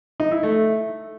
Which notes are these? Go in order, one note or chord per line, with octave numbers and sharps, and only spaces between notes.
D#4
E4
A3